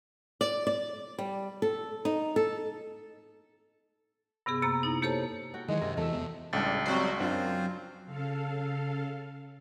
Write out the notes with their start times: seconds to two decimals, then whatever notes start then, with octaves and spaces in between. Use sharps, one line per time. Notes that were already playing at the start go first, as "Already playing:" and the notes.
0.41 D5
0.67 D5
1.19 G3
1.62 A4
2.05 D#4
2.36 A4
4.46 G2 C3 B3 G#4
4.62 F#2 C3 A#3 A#5 A6
4.83 D#4 E4
5.02 A#3 G4 A4 C5 C#5 A5
5.54 F#4 G5
5.68 D#3 E3 F#3 G#3 C#5
5.81 F#2 C3 A#3
5.97 E2 E3 A3 E5
6.12 E2 B3
6.53 C#2 A2 G3 D4 A6
6.86 F#3 G3 C4 F#4 C5
7.20 F#2 C4 D4 F4 C5
8.06 C#3 A4 F5